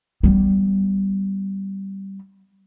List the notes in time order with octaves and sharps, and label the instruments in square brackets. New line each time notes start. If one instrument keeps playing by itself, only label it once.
[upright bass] G3 B3